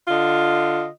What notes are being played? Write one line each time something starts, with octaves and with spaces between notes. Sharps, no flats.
D3 F4 D#5